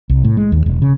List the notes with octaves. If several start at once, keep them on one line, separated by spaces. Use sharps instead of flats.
C2
A2
G#3
D#2
E1
C#3